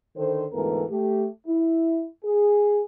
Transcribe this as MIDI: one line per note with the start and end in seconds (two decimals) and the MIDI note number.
0.17 0.45 50
0.17 0.45 51
0.17 0.45 69
0.17 0.45 72
0.53 0.83 38
0.53 0.83 44
0.53 0.83 52
0.53 0.83 59
0.53 0.83 69
0.53 0.83 70
0.90 1.26 57
0.90 1.26 67
1.46 2.05 64
2.24 2.81 68